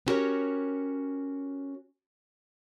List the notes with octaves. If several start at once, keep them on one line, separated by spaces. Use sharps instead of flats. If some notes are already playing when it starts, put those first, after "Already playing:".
B3 C#4 F#4 G4 A#4 C#5